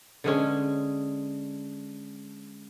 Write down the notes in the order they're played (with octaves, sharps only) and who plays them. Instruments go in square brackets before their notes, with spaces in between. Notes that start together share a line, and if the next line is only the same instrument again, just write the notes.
[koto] D3 G#3 C#4